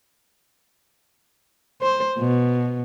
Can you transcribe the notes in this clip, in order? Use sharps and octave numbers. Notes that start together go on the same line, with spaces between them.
C5
B2